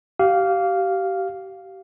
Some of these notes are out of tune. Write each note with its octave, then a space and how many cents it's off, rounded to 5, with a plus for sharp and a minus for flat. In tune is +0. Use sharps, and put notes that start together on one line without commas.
G4 -30 F5 +0